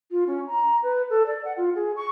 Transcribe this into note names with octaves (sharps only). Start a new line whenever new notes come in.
F4
C#4
A#5
B4
A4
D5
F#5
F4
G#4
C#6